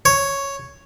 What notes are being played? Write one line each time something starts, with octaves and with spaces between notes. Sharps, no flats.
C#5